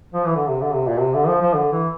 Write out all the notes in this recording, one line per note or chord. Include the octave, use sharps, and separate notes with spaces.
F3
E3
D3
C3
D3
C3
A#2
C3
D3
F3
F3
D3
E3